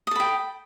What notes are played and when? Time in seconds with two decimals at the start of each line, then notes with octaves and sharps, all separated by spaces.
0.07 D#6
0.11 A4
0.16 B5
0.20 G5